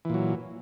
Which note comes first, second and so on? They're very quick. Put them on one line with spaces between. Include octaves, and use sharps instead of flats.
E3 A#2 F#3